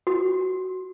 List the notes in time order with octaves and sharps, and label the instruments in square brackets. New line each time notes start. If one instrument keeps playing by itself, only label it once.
[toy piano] F#4